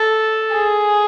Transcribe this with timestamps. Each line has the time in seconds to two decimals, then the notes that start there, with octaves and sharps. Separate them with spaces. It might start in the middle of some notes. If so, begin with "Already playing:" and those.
Already playing: A4
0.54 G#4